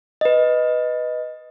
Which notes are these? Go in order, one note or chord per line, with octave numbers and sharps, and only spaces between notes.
B4 D#5